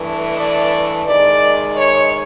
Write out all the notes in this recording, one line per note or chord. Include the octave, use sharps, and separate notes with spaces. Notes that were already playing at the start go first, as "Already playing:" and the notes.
Already playing: G2 E3 A3
D5
C3 D#3 G#3 D5
C#5